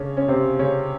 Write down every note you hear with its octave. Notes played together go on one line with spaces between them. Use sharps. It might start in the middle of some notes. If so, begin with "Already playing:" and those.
Already playing: C#3 C#4 D4
C#4
C3 C4
C#3 C#4